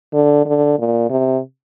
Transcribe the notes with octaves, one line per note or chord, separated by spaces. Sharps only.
D3
D3
A#2
C3